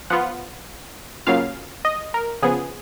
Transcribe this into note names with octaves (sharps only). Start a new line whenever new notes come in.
F3 B3 F4 F#5
C#3 F#3 A#3 C#4 F4 F5
D#5
A#4
C#3 F3 B3 G#4